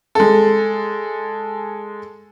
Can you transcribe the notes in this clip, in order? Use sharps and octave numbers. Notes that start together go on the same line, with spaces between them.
G#3 A4